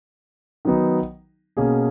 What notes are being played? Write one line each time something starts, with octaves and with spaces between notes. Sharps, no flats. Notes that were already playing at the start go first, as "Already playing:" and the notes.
D#3 F#3 B3 D#4
B2 A#3 C#4 G#4